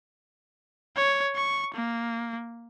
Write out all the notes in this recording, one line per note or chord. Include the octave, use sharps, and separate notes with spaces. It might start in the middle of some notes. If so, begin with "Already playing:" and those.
C#5
C#6
A#3